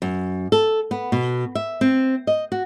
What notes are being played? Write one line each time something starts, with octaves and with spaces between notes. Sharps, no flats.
F#2
A4
B3
B2
E5
C4
D#5
F#4